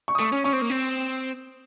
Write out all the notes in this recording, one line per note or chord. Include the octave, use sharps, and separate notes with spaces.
C#6
D#6
A3 C#6
C#4
C#4 C#6
C4
A#3
C4